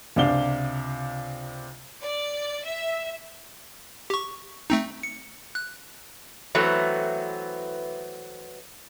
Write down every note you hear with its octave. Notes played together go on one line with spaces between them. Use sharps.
C#2 C3 D4 F5 G7
D5
E5
G4 C#6
A3 C4 D#4
C#7
F#6
E3 F#3 A3 B3 C4